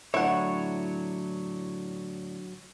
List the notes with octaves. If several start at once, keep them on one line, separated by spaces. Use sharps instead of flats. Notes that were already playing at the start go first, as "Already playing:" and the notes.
A2 D3 F#3 D4 E4 C#5 F#5